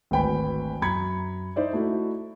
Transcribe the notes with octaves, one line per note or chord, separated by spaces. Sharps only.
G#1 D2 B4 G5 G#5 B5
F#2 A#5 B5 G#6 C#7
D#4 C5 D5 E5
A3 D#4 E4 F#4